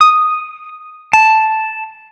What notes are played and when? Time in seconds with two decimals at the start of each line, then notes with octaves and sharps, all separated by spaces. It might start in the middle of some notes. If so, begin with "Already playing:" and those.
0.01 D#6
1.13 A5